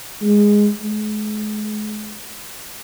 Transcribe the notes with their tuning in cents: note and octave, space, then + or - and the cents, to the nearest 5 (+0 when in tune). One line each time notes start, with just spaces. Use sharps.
G#3 -5
G#3 +40